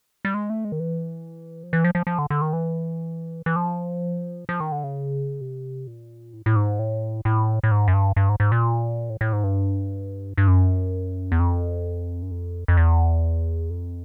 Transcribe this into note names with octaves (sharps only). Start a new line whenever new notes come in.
G3
G#3
A3
G#3
D#3
E3
F3
E3
F3
F3
F3
D3
D3
D#3
E3
E3
F3
F3
D#3
D3
C#3
C3
A#2
A2
A2
G#2
A2
A2
A2
G#2
F#2
G2
G2
G#2
G#2
A#2
A2
A2
G#2
G2
G2
F#2
E2
F2
F#2
F2
F2
E2
F2